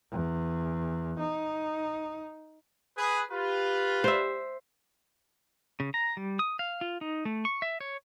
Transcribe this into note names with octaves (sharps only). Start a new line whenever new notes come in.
E2
D#4
G#4 B4
F4 G4 B4
C5 E5
C#3
A#5
G3
D#6
F5
F4
D#4
A3
C#6
E5
C#5